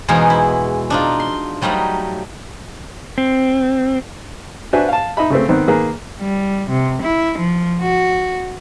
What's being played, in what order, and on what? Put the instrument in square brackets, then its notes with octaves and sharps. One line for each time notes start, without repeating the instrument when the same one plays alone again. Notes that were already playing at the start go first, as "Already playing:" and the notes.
[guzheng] E2 B2 G#3 D#4 G#4 F5
E4
D4 D#4 F4
C6
F#3 G3 A3 D#4 F5
[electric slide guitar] C4
[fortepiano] D4 F#4 B4 C5 E5 G#5
F5 A5
D#4 D#5 E5 B5
C#3 A3 C4
D#3 B3 C4
D#3 A#3 G#4 B4
[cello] G3
C3
E4
F3
F#4